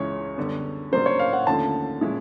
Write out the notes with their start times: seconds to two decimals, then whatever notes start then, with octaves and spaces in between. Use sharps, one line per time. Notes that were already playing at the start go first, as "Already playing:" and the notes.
Already playing: C#2 C#3 E3 G#3 C#5
0.37 F#2 D3 G3 B3
0.92 C#3 F#3 A#3 D4 C5
1.06 C#5
1.19 F5
1.33 F#5
1.47 D#2 D3 F3 A3 C#4 A5
2.01 A#2 F3 G#3 C#4 E4